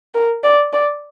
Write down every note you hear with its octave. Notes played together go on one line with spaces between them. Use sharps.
A#4
D5
D5